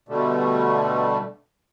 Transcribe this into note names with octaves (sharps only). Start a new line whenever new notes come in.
B2 D3 G3 A3